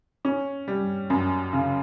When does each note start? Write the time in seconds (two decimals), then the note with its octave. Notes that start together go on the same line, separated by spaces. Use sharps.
0.25 C#4
0.68 G3
1.10 F#2
1.53 C#3